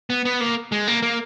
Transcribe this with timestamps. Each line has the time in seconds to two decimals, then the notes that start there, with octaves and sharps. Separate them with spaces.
0.10 B3
0.25 B3
0.41 A#3
0.72 G#3
0.88 A#3
1.02 A#3